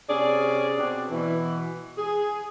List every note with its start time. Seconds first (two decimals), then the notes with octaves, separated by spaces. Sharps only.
0.10 C3 C#4 G#4 D5
0.78 B2 C4 D4
1.11 B2 E3
1.98 G#4